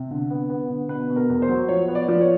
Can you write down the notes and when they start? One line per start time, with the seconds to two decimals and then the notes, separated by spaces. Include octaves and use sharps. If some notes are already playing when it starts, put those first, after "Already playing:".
Already playing: C3
0.11 D3
0.30 B3
0.50 B3
0.70 D3
0.89 B2 B4
1.09 B2
1.16 A#4
1.30 E2
1.42 C5
1.49 F#3
1.68 F3 C#5
1.88 B3
1.95 D5
2.08 F3
2.21 C#5